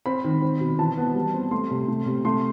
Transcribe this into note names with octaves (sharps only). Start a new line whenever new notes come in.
C4 B5
D#3
C4
B2
E3 A5
B3
G3
C4
A3 C6
C3
A3
C3
A3 C6